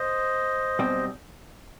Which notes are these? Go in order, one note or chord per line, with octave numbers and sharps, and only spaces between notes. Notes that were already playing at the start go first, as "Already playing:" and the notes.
Already playing: C5 D#5
B1 B2 G3 C4